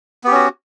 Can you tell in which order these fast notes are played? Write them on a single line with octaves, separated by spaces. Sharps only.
B3 G4 C#4 F#4